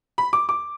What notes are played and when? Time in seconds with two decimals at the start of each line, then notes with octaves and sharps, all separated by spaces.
0.18 B5
0.33 D6
0.49 D6